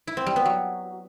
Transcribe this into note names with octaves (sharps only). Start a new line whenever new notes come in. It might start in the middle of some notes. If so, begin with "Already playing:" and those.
E4
C4
G3
B3
F#3